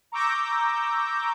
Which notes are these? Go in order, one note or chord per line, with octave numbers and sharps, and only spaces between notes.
A#5 C#6 D6 E6 G6 A#6